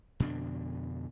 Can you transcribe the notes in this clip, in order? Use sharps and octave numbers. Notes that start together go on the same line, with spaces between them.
F2 B2 D3 D4